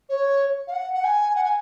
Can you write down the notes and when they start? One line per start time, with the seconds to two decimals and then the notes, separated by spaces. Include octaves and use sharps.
0.09 C#5
0.67 F5
0.72 F#5
0.94 F#5
1.04 G#5
1.35 F#5
1.44 G#5